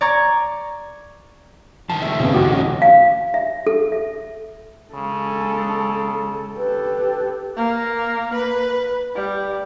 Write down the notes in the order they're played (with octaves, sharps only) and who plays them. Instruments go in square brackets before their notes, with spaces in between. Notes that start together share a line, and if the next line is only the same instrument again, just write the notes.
[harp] D5 A#5 C#6 G#6
[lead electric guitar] D#3 F3 [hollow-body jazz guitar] A5
[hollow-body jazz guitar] C3 A3 [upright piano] E5
[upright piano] F2 B3 [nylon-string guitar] C#3
[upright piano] B1 G5 D6 [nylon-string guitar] F#4
[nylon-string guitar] C#4 [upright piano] F#4 D#5
[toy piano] F5
E5
A4
E5
[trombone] C#3 [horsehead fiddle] G#3 A4
[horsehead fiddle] G4 A4 [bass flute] B4
[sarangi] A#3
B4
G3